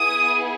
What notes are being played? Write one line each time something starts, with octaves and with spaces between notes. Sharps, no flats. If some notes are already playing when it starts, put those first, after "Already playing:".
Already playing: B3 E4 G#4 D#6